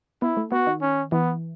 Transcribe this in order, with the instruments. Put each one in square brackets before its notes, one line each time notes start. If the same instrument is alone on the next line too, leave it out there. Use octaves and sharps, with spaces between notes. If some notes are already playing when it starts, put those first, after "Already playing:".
[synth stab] B3 [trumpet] E4
[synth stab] A3
[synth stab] B3 [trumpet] F#4
[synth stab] D#3
[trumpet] C#4
[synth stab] E3 [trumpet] B3